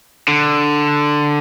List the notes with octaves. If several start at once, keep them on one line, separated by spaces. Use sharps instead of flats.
D3